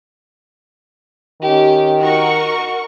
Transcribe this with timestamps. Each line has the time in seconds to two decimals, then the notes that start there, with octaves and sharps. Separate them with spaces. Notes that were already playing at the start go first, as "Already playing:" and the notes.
1.42 D#3 C#4 G4
2.00 D#4 F#4 A#4 C#6